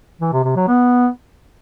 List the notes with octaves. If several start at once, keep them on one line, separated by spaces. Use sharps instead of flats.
E3
C3
C3
F#3
B3